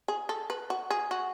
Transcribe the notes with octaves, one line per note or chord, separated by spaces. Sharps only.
G#4
A4
B4
F#4
G#4
F#4